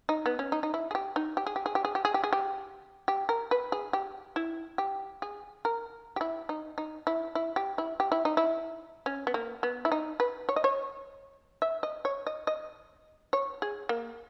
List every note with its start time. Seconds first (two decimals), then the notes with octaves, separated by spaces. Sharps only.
0.09 D#4
0.26 B3
0.39 C#4
0.52 D#4
0.63 D#4
0.74 E4
0.91 G#4
0.95 G4
1.16 D#4
1.37 G4
1.47 G#4
1.56 G4
1.66 G#4
1.75 G4
1.85 G#4
1.95 G4
2.05 G#4
2.14 G4
2.24 G#4
2.33 G4
3.08 G4
3.29 A#4
3.51 B4
3.72 G#4
3.93 G4
4.36 E4
4.78 G4
5.22 G#4
5.65 A#4
6.16 G4
6.21 E4
6.49 D#4
6.78 D#4
7.07 E4
7.35 E4
7.56 G4
7.78 E4
8.00 G4
8.12 E4
8.25 D#4
8.37 E4
9.06 C#4
9.27 B3
9.34 A#3
9.63 B3
9.85 E4
9.92 D#4
10.20 B4
10.49 C#5
10.56 D#5
10.64 C#5
11.62 E5
11.83 D#5
12.05 C#5
12.27 D#5
12.47 D#5
13.33 C#5
13.62 G#4
13.89 A#3